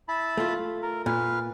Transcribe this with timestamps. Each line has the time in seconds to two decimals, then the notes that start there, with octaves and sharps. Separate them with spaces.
0.08 E4 A5 B5
0.37 A3 F4
0.82 A#4
1.06 A#2 B4 F5